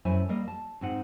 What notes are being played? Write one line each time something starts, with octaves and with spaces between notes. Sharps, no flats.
F#2 A3 E4 A4 C5 G#5
G3 A#3 A#4 D#5 F5
A5
G#2 C4 D#4 F#5